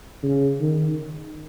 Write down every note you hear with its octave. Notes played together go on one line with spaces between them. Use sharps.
C#3
D#3